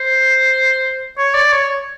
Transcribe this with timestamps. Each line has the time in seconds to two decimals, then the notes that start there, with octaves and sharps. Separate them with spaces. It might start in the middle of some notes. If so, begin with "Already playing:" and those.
Already playing: C5
1.18 C#5
1.34 D5
1.52 C#5